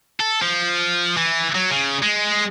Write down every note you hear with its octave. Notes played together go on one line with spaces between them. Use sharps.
A4
F3
E3
F#3
C#3
G#3